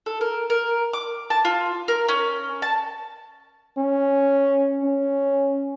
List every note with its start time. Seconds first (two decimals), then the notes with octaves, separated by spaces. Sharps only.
0.06 A4
0.21 A#4
0.50 A#4
0.93 D6
1.30 A5
1.45 F4
1.88 A#4
2.08 C#4
2.62 A5
3.77 C#4
4.83 C#4